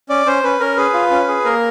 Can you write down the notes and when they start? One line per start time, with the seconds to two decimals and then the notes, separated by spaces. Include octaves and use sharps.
0.09 C#4 D5
0.26 C#4 C5
0.44 C#4 B4
0.60 C#4 A#4
0.77 G#4 B4
0.94 F4
1.11 C#4
1.28 G#4
1.45 A#3 A#4